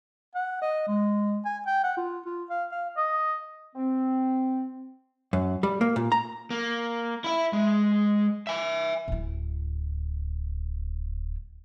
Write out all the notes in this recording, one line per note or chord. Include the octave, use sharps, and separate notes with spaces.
F#5
D#5
G#3
G#5
G5
F#5
F4
F4
F5
F5
D#5
C4
F#2
G3
A#3
A#2
A#5
A#3
E4 E5
G#3
E5 G#5
D1 E4